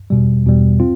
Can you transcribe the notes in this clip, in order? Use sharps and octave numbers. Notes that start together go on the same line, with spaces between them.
E2 B2 G3
E2 B2 G3
C4 F4